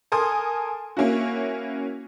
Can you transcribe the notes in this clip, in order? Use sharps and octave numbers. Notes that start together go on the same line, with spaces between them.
A4 A#4 G#5 C6 D#6
A#3 C#4 E4 F#4